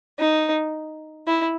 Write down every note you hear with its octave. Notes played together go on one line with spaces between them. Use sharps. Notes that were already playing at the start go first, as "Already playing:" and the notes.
D#4
E4